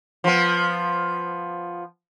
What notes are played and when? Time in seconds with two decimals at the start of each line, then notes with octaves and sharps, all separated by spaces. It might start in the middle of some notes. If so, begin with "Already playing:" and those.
0.24 F3 B3